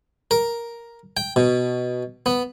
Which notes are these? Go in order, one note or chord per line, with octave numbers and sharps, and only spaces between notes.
A#4
G5
B2
B3